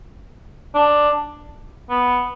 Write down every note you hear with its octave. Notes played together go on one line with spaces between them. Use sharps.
D4
B3